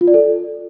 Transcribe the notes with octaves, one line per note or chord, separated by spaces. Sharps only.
F4
D5
A4